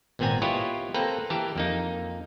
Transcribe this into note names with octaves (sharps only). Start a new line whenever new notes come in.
G#1 A#2 B3 C4 G#5 A#5
E4 F4 G4 B4 C#5 D#5
A#3 C4 A4 B4 A#5
E3 G4 A#4 A5
F2 A#3 D#4